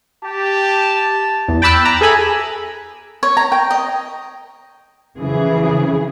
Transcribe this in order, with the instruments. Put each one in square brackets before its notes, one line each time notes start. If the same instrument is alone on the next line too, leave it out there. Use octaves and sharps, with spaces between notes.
[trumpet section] G4 [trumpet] A5
[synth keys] E2
G5 A5 B5 D6 E6 F#6
A#5
G#4 A4 E5 G#5 B5
[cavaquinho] C#5
A#5
G5
D#5
[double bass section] F2 E3 [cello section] C#3 F#3 G#4